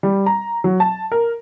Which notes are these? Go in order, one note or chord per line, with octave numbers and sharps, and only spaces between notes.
G3
A#5
F#3
A5
A#4